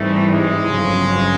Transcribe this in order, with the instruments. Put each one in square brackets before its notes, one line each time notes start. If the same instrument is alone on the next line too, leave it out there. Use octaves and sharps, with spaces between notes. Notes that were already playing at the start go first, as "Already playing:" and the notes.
Already playing: [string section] G#2 E3 G3 C4 D#4 [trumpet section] A3
[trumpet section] G#3
[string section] G1 F2 C#3 F#3